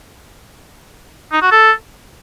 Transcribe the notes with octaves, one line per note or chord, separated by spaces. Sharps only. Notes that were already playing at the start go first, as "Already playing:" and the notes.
D#4
F#4
A4